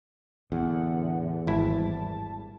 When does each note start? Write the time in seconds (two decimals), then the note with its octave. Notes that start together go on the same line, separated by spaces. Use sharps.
0.52 E2 A2 D3 F#5
1.47 G#1 A2 G3 E4 A5